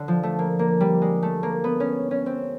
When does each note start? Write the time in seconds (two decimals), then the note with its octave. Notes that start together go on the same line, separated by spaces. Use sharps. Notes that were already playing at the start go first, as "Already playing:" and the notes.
Already playing: D3
0.08 F3
0.23 A3
0.39 A#3
0.59 A#3
0.80 G3
1.02 G#3
1.23 A3
1.43 A#3
1.64 B3
1.80 C#4
2.11 C#4
2.26 C4